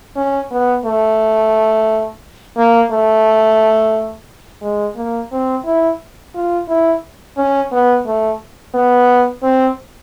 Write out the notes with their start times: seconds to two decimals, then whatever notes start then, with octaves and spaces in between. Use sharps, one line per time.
0.16 C#4
0.51 B3
0.85 A3
2.57 A#3
2.91 A3
4.62 G#3
4.96 A#3
5.32 C4
5.65 E4
6.35 F4
6.68 E4
7.37 C#4
7.72 B3
8.06 A3
8.74 B3
9.43 C4